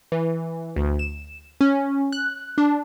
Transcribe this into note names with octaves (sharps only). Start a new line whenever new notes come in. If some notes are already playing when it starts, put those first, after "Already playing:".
E3
D2
E7
C#4
F#6
D4